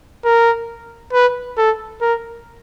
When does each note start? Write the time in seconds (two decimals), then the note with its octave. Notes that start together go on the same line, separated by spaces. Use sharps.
0.25 A#4
1.13 B4
1.57 A4
2.01 A#4